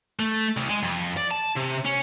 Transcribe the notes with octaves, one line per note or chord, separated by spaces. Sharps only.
A3
C2
G#3
F2
D5
A5
C3
C#4